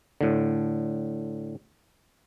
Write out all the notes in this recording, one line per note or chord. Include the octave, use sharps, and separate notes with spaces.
A2 D3